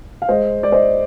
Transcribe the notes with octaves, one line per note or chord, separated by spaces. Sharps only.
F5
G#3 C5 D#5
G#3 D5
C5 D#5